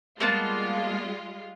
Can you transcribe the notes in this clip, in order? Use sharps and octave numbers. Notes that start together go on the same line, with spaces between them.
G3 G#3 A#3 B3 F4 A5